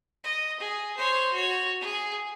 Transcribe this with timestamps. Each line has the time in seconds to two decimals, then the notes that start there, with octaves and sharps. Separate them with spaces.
0.24 D#5
0.60 G#4
0.97 C5 C#5
1.33 F#4 C#5
1.81 G#4